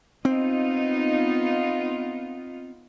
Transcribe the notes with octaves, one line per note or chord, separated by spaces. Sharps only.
B3 C4 D#4 F4